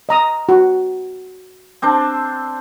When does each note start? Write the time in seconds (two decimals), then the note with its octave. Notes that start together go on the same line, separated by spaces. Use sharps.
0.09 D#5 A#5 D#6
0.49 F#4
1.82 C4 D4 C5